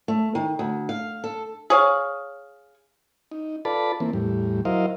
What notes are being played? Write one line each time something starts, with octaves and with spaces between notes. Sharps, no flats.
A3
D#3
D2
F5
A4
G#4 C#5 F5
D#4
F4 A4 B4 D5 A5 B5
E3 A#3 C4
E2 A2 G3
F#3 E4 A#4 C5 D#5 F5